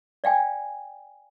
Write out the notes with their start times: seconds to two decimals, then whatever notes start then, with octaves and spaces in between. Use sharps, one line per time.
0.24 D5 F5 G5 G#5